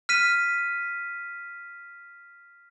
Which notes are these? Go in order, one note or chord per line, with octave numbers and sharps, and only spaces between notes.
F6 B6 D#7